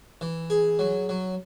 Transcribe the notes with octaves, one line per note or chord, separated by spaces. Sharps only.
E3
G#4
F#3
F#3